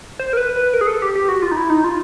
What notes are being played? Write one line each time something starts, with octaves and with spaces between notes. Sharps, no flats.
C5
A#4
B4
B4
A#4
G#4
A4
G4
G4
F#4
F4
D#4
E4
D#4
F4